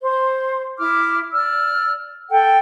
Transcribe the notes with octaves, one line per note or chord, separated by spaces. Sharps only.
C5
E4 D6 F6
D5 E6 F6
A4 F#5 G5